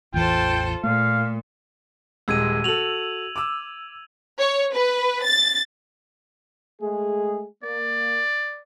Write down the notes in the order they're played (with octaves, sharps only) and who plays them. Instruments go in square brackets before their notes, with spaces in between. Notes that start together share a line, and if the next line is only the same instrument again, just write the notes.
[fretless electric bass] A1 E2 E3 [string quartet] F4 A4 C5 [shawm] G5
[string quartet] A#2 [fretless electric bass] A3 [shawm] F5
[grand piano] D#1 G#3 [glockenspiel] E6 G#6 D#7
[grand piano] F#4 A4 [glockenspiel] F7 F#7
[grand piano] D6 E6
[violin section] C#5
B4
A6
[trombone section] G#3 A3 G#4
[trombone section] A#3 [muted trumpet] D5